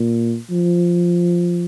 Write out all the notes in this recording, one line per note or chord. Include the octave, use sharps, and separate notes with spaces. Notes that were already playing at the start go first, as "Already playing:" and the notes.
Already playing: A#2
F3